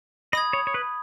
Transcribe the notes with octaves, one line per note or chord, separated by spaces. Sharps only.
D#5 B5 D#6 G#6
C#5
C#5
B4